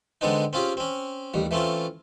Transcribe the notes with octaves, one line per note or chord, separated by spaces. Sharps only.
D3 G#3 B3 C4 D4 D#4
C4 C#4 F4 G4 G#4
C4 C#4
A1 D#2 G3
E3 A3 C4 C#4 F4